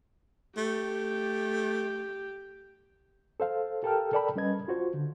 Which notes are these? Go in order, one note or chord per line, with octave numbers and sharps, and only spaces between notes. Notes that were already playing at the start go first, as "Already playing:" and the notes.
A3 G4
A4 C5 F5
G4 A4 A#4 G5 A5 F6
A4 A#4 D5 G5 A5 B5
G3 C#4 B4 D#5 G#6
F4 F#4 C5
D3